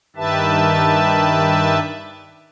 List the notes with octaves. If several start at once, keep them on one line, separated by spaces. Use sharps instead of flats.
G2 D#3 G4 B4 E5 A5